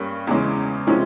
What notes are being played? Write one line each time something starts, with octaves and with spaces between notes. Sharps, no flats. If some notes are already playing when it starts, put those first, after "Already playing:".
Already playing: G2 G3 A#3 C#4
E2 C#3 E3 G#3 C#4
C3 F3 G#3 C#4 E4